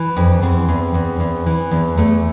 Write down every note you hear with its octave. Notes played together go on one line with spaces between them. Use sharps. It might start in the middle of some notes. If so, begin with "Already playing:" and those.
Already playing: E3
F2
E2 C4
E2
E2
E2
E3
E2
E2 A3